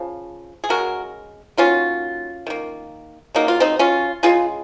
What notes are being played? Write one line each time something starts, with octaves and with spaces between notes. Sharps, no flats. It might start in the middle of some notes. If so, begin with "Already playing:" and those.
Already playing: C#3 F3
G#4
C#3 G#3 F#4 A#4
D#3 F#3 A#3 C#4 F4
D#3 A#3
C#3 F#3 A#3 D#4
F4
C4 D#4
C#4 F4
C#3 G#3 F4 G#4